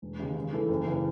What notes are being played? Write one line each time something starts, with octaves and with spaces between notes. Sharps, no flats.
E1
D#2 C#3 G#3
C#3
E3 A3
F#1
C#3 E3